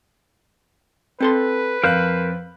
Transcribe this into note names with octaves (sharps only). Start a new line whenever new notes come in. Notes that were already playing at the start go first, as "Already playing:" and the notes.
C4 A4 B4 C6
F2 A#4 C5 F5 F#6